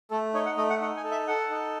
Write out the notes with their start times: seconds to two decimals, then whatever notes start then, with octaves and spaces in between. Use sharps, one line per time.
0.11 A3 A4
0.34 D#4 C#5
0.46 F#5
0.57 A3 D#5
0.70 F#5
0.81 D#4 F#5
0.97 G#5
1.04 A4
1.11 E5
1.28 A4 F#5
1.50 D#4